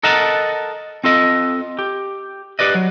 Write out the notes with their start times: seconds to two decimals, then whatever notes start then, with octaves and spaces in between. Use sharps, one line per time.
0.03 A4 A#4 D#5 F#5 A5 A#5
1.04 C4 F4 A4 D#5
1.79 G4
2.59 G4 B4 D5 D#5
2.75 F#3